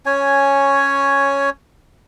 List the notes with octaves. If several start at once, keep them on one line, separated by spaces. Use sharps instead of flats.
C#4 C#5 G#5